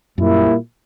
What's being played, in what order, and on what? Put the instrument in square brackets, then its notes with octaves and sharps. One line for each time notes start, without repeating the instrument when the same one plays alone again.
[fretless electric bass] F#2 [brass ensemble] A#2 G3 A#3 E4